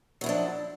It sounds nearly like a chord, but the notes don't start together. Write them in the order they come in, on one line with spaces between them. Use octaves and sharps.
F#3 E4 F3 D4